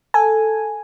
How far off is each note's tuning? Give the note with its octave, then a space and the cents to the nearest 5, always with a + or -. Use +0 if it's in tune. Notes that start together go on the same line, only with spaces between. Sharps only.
A4 +0 G#5 +0